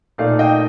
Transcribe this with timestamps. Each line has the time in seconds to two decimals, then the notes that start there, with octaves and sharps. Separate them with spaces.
0.18 A#2 A3 D#4 D5 F5
0.39 D#5 G5